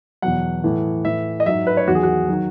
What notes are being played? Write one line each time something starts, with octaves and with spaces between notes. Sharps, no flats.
E2 B2 F#3 F#5
A2 E3
A2 E3 E5
D#5
G#2 F#3 E5
B4
C#5
E2 D#3 F#3 F#4
G#4
F#4
D#3 F#3